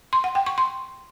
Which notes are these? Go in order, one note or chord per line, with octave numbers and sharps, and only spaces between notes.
C6
F#5
G5
C#6
C6